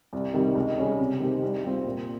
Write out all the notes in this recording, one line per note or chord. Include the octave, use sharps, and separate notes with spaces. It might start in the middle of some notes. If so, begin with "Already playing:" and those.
C2
C3 D#3 G3
C#2
C#3 G3 C#4 G#4
C3
D#3 G#3 C4 G4
C2
C3 G3 C4 F4
A#2